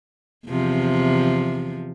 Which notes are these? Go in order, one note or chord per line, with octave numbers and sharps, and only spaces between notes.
E2 C3 F3